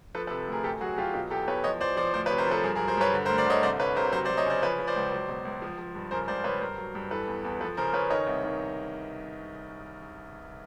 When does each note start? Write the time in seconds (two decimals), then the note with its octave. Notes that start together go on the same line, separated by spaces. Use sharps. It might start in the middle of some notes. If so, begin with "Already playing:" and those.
0.15 F3 A4 B4
0.27 A4 B4
0.31 C3
0.48 D2 G#4 A#4
0.64 F#2 G4 A4
0.81 F#3 F#4 G#4
0.98 F#3 F4 G4
1.14 B2 F4 G4
1.30 E2 G4 A4
1.48 E2 B4 C#5
1.64 F3 C#5 D#5
1.80 F3 C5 D5
1.97 F3 C5 D5
2.14 D2 C5 D5
2.26 B4 C#5
2.31 C3
2.38 A#4 C5
2.46 F3 A4 B4
2.64 G2 G#4 A#4
2.75 G#4 A#4
2.80 F#3
2.88 A#4 C5
2.97 G2 B4 C#5
3.14 D3
3.25 A#4 C5
3.30 D2
3.38 C5 D5
3.46 D3 C#5 D#5
3.63 C2 C5 D5
3.79 C2 B4 C#5
3.96 C3 A#4 C5
4.12 F#3 A#4 C5
4.25 C5 D5
4.30 F#3
4.37 C#5 D#5
4.46 C#3 C5 D5
4.62 F3 B4 C#5
4.79 F3
4.87 C5 D5
4.96 C#2
5.12 F#3
5.29 B2
5.45 C#2
5.62 F3
5.79 F3
5.95 G2
6.11 C#3 A#4 C5
6.28 C#2 C5 D5
6.44 C#3 B4 C#5
6.61 G2 A#4 C5
6.78 F#3
6.95 G2
7.11 E3 A4 B4
7.28 E2
7.45 E2
7.61 F3 A4 B4
7.77 C#3 A#4 C5
7.93 C#3 B4 C#5
8.10 D#3 C#5 D#5
8.27 C2
8.44 D#3